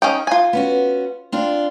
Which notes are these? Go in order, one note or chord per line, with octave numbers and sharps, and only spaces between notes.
C#4 D#4 G5
F4 G#5
B3 C#4 F#4
C4 D4 F4